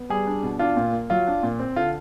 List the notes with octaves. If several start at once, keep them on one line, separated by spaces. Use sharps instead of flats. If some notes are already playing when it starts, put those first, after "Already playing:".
Already playing: B3
G3 G#4
D4
B2
D4 F4
A#2
A#3
F#3 F4
D4
A#2
C4
D3 F4